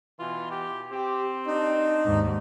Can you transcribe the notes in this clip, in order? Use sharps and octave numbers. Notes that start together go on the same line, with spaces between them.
B2 E3 F4
G4
C4 G4
D4 D#4
D#2 G#2